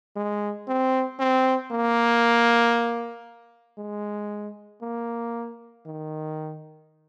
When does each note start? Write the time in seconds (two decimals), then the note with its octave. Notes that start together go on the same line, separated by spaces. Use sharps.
0.16 G#3
0.68 C4
1.20 C4
1.71 A#3
3.78 G#3
4.82 A#3
5.86 D#3